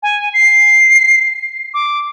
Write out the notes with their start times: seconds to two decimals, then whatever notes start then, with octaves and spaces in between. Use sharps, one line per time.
0.03 G#5
0.34 C7
1.74 D6